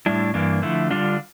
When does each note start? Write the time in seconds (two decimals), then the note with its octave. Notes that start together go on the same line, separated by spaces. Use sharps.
0.06 A2 G3 D4 E4
0.34 G2 E3 A#3 D4
0.62 D3 F3 A3 E4
0.91 D3 G3 D4 F4